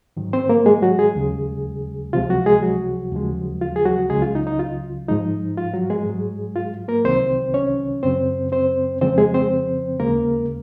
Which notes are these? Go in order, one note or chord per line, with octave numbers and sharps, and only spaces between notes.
G#2 D#3 F#3
C4 C5
A#3 A#4
G#3 G#4
F#3 F#4
G#3 G#4
D#2 C#3 F#3
C#2 C3 F3 G#3 F4
F#3 F#4
G#3 G#4
F#3 F#4
D#2 C#3 F3 G#3
F4
G#4
F#3 F#4
C#2 C#3 F#3 G#3 G#4
F4
D#4
D#4
F4
G#2 F3 G#3 D#4
F4
F#3 F#4
G#3 G#4
G#2 F#3
F4
A#3 A#4
C2 C3 D#3 F#3 C4 C5
C#4 C#5
F#2 C#3 F#3 C4 C5
C4 C5
F2 C#3 F3 G#3 C4 C5
G#3 G#4
C4 C5
D#2 C#3 G#3 A#3 A#4